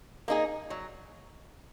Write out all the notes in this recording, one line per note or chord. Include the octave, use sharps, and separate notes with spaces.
A#3 D#4 G#4
F#3